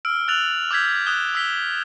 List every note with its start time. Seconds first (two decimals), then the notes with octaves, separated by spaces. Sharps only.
0.05 E6 F6 D7
0.28 E6 F#6 A6 F7 F#7
0.71 D6 E6 G6 G#6 B6
1.06 D#6 F#6 E7 G7
1.35 E6 B6 G7